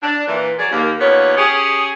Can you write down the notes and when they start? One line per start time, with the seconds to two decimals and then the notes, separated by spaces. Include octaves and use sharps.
0.03 D4
0.28 A#2 E3
0.59 F#3 G#4 D5
0.72 D#2 A#3
1.01 D#2 B3 F4 C#5
1.37 C#4 G4 G#4